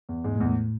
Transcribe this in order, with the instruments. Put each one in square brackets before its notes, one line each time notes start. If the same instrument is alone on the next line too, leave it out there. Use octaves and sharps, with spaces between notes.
[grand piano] E2
[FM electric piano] G#2 [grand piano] G#3
[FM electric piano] A2
[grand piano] E2
[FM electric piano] A2